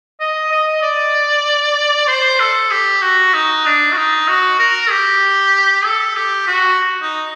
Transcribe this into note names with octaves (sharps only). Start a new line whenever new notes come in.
D#5
D#5
D5
C5
A4
G4
F#4
D#4
D4
F#4
D#4
F#4
A#4
G4
A4
G4
F#4
D#4